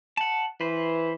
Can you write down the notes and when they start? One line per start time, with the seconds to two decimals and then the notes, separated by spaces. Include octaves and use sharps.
0.17 F#5 A5
0.61 E3 B4 C5